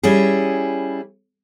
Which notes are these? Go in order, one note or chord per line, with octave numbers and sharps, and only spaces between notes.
G3 C#4 E4 G#4